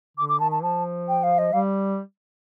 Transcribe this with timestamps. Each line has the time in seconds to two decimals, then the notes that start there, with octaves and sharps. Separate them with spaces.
0.17 D3 D6
0.29 D6
0.40 D#3 A5
0.52 A5
0.63 F3 A5
1.08 G5
1.23 F5
1.38 D#5
1.53 G3 F5